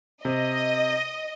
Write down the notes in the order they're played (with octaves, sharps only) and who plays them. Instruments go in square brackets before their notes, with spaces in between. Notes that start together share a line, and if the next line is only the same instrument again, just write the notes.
[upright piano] C3 [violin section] D#5